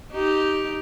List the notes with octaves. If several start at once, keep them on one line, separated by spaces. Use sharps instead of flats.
D#4 G4